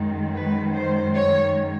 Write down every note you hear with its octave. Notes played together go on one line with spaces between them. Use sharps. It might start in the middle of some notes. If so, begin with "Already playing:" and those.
Already playing: F#2 D#3 G#3
B4
C5
C#5